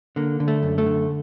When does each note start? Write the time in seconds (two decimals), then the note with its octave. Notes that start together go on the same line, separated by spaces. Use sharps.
0.16 D3 A#3
0.40 D3
0.48 A3
0.63 F#2
0.78 A3
0.86 D3